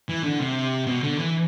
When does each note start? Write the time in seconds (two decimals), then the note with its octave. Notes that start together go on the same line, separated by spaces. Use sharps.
0.09 E3
0.24 D3
0.40 C3
0.86 B2
1.02 D3
1.18 E3